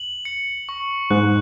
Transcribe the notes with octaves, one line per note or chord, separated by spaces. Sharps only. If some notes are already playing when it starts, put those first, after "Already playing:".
Already playing: F#7
C#7
C#6
G#2 F#6